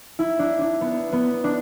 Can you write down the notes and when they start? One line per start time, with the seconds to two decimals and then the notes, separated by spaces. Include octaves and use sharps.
0.19 E4
0.39 D4
0.61 D4
0.81 B3
1.12 B3
1.44 D4